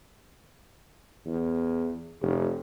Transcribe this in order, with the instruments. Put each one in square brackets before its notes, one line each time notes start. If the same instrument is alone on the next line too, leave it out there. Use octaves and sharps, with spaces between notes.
[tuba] E2
F1